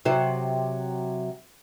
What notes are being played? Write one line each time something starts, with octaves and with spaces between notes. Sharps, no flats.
C3 F#3 C5